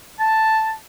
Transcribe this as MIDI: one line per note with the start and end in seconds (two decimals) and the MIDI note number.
0.20 0.74 81